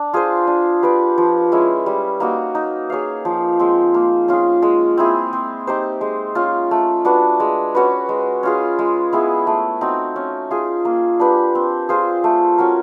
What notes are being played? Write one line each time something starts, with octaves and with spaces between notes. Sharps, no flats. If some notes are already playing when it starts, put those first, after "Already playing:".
Already playing: D4
F4 G#4 C5
D4
G4 B4 D5
F3
G#3 C#4 E4
G3
A#3 D#4 F#4
D#4
G#4 C#5 F5
F3
G#3 C4
A#3
C#4 F4 G#4
G#3
C4 E4 G#4
C4
D#4 G4 C5
G#3
C#4 F4
A3
D4 F#4 B4
G#3
C#4 F#4 B4
G#3
C#4 F4 G#4
G#3
B3 E4 G#4
A3
C4 D#4 F#4
C#4
F4 G#4
A#3
D4 G4 B4
C4
F4 G#4 C5
A3
C#4 F#4 A#4